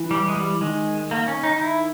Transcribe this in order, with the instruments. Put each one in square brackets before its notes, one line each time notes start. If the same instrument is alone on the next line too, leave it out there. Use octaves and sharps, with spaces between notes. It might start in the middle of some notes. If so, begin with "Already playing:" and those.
Already playing: [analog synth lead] E3
[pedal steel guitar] G3
G#3
G3
[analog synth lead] D#3 [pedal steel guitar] G#3
[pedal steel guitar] A#3
C#4
D#4
D#4
E4